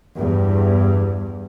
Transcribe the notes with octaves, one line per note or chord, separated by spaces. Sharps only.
E2 G2